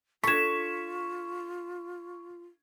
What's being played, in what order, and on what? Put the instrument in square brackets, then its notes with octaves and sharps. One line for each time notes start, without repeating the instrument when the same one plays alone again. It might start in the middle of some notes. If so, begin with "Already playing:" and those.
[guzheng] D4 A4 [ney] F4 [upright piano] C#6 G#6 [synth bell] B6 E7